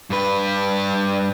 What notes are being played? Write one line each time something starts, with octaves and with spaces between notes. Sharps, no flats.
G2 B4